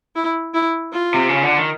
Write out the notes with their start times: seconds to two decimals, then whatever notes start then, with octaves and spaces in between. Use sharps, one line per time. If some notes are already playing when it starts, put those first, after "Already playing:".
0.15 E4
0.54 E4
0.93 F4
1.14 C3
1.29 C#3
1.43 D3
1.57 D#3